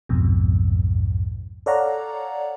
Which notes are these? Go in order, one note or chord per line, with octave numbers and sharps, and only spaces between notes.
B1 F2 G#2 B2
A4 C#5 D5 F5 F#5 A#5